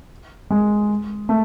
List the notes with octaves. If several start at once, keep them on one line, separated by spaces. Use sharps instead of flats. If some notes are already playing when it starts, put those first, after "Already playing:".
G#3
A3